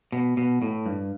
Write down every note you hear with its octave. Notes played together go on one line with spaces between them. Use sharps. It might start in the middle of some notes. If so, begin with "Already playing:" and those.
B2
B2
A2
G2